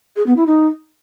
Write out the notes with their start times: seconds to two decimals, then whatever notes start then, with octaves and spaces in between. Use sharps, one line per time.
0.16 G#4
0.26 B3
0.36 E4
0.46 D#4